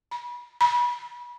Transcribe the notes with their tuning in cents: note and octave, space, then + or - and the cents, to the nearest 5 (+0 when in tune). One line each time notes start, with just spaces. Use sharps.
B5 -30
B5 -30